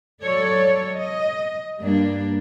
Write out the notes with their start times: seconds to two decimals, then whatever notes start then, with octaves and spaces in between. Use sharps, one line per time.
0.23 F#3 A4 C#5 D5
0.94 D#5
1.80 G2 G3 A#3 D4